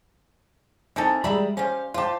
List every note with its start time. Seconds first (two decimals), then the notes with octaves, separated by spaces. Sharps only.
0.96 E3 C4 D#4 A4 A#4
1.24 G3 G#3 E5 A#5 B5
1.57 G3 C#4 C5 F5
1.94 F4 G4 C5 A5